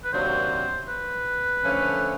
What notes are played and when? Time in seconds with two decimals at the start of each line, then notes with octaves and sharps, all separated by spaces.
0.04 B4
0.13 C3 D#3 F#3 A#3 D4 C5
0.89 B4
1.64 D3 F3 A3 C#4